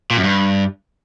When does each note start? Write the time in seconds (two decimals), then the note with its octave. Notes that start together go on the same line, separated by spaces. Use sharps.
0.11 A#2
0.17 F#2
0.24 G2